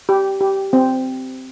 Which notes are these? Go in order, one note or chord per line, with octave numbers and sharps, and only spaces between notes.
G4
G4
C4